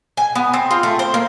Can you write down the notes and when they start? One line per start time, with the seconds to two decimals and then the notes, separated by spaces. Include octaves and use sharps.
0.17 G#5
0.35 B3
0.54 C4
0.71 F4
0.83 A3
0.99 C5
1.14 A#3